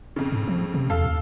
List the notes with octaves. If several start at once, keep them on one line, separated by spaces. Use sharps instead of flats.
F2 C#3
G#2
F3
C3
E2 A4 F5 E6
D#2